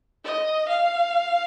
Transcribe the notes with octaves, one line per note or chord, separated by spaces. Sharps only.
D#5
F5